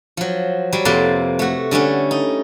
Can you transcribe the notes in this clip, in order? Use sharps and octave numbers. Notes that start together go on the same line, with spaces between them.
F3 F#3
F#3 G3
F2 C3 A#3 B4 A5 C6
A3 F#4
D3 G3 A3 C#4
D#4